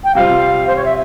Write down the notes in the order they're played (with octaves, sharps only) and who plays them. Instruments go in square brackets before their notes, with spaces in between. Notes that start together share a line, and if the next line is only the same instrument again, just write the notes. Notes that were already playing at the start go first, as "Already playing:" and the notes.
[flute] G5
[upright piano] C3 G3 C4 F4 [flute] F5
[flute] C5
C#5
E5